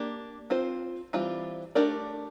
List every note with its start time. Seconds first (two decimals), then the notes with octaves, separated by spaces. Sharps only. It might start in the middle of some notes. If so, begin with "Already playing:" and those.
Already playing: A#3 D4 G4
0.50 C4 F4 C5
1.13 E3 G3 C4 F4
1.75 A3 D4 G4 A#4 D5